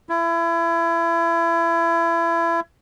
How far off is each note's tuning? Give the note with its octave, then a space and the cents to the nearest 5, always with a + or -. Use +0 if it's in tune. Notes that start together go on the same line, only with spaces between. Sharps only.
E4 +30